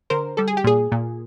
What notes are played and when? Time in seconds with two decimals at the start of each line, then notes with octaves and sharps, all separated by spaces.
0.10 D3 A#4 C5
0.37 G3 A4
0.48 G#4
0.57 G4
0.64 A#2 G#4
0.92 A#2